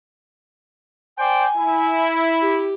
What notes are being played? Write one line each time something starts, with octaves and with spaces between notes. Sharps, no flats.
C5 D5 G5 G#5
E4
G4